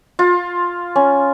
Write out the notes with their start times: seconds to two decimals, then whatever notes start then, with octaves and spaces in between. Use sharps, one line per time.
0.19 F4
0.96 C#4